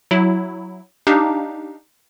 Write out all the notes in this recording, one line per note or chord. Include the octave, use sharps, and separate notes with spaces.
F#3 E4
D4 D#4 G4 F5